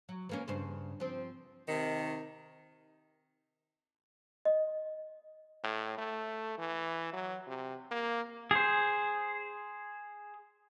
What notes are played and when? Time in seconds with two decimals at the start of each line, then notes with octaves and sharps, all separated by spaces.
0.09 F#3
0.29 E3 A#3 C#4
0.48 G2 C#3 C5
1.00 F3 C4
1.69 C3 D#3
4.45 D#5
5.64 A2
5.98 A3
6.58 E3
7.13 F#3
7.47 C3
7.91 A#3
8.51 G#4 C5